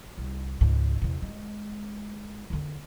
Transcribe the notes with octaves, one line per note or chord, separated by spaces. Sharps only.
C2
C#2 G#2
E2 C3
G#3
E2 D3